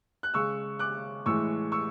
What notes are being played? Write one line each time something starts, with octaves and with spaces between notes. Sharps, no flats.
F#6
C#3 G#3 C#6 E6
D6 F#6
A2 E3 G#3 C#6 E6
C#6 E6